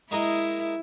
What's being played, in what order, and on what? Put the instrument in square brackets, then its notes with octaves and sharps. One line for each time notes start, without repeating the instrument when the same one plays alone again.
[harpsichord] G#3 A#3 D#5 [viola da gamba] E4